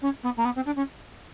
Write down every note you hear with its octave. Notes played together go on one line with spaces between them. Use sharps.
C#4
B3
A#3
B3
C4
D4
C#4